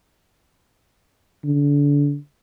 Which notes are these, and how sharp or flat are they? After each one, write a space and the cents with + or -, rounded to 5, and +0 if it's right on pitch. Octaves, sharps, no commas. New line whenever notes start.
D3 -30